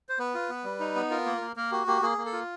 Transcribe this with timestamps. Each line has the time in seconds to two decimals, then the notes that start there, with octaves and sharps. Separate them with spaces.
0.09 C5
0.19 B3 B4
0.35 F4
0.49 B3
0.64 G3
0.80 D#4
0.96 B3
1.10 F4 A#4
1.26 A#3
1.41 A#3
1.56 A#3 A#4
1.72 F#4 G4
1.87 A#3 G4
2.02 A#3 G#4
2.18 A#3
2.26 A4
2.33 F4